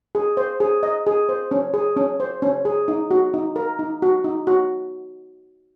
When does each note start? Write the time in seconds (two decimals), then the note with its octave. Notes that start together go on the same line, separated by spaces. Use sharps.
0.15 G#4
0.37 C5
0.60 G#4
0.83 D#5
1.06 G#4
1.29 C5
1.51 C#4
1.74 G#4
1.97 C#4
2.20 C5
2.42 C#4
2.65 G#4
2.88 D#4
3.11 F#4
3.34 D#4
3.56 A#4
3.79 D#4
4.02 F#4
4.24 D#4
4.47 F#4